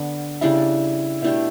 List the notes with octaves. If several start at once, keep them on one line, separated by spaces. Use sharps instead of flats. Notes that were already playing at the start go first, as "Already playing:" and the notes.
Already playing: D3 B3 D4
C#3 G3 D4 E4 G4
B2 A3 D4 E4 G4